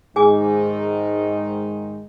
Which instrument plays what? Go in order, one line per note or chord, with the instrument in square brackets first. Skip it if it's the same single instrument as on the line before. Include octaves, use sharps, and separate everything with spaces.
[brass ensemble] G#2 D#3 D#4 [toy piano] G#4 G#5 D6